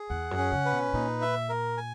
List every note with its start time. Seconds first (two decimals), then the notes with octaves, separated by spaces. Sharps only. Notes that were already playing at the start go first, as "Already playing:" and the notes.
Already playing: G#4
0.10 E2 F#5
0.31 F#2
0.38 C#4
0.52 C#3
0.65 B4
0.72 B2
0.93 A#2 D#4
1.22 E5
1.49 A#4
1.77 G#5